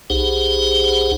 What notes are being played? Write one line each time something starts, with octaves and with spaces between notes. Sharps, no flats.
B1 D#4 G4 G#4 C5 F#5